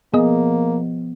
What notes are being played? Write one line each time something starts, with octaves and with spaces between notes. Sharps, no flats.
F3 A#3 B3 G#4 D#5